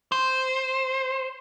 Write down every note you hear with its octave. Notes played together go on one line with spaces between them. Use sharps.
C5